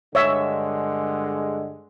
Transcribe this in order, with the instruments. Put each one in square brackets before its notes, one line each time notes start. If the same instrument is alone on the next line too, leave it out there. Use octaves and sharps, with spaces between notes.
[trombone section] G2 D3 G#3 [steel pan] C#5 E5